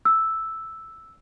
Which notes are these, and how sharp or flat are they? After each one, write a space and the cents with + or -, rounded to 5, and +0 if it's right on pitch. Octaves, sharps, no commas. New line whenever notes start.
E6 +0